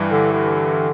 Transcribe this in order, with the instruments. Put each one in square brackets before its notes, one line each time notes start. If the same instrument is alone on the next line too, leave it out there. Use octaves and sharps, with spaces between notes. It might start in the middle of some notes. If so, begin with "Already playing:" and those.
Already playing: [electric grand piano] G2 E3 G3
[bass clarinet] D3
D3